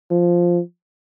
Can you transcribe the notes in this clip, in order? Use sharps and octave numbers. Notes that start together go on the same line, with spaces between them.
F3